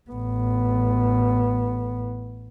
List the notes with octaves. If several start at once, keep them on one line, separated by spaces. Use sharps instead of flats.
A1 B3